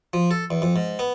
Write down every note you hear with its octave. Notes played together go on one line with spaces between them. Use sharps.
F3
A4
E2
F2
G#2
B3